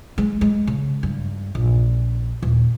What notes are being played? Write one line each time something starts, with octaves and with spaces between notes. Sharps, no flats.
G#3
G#3
C#3
G2
A#1
D#1